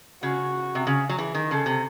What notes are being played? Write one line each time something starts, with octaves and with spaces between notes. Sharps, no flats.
C#3 F#4
C3
C#3
F#3
E3 G#4
D#3
C#3 A4
C3